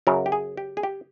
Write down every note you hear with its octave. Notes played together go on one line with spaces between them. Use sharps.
F#2 C#3 F#3 A#4
G4
G#4
G4
G#4
G4